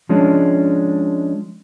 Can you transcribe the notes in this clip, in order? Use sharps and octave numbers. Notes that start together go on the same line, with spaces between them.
F3 G#3 C#4 D4